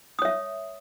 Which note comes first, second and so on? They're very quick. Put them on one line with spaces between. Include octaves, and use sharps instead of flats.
D#6 C#5 E5